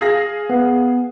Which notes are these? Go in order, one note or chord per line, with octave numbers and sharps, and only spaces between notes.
G#4 F5 A#6
B3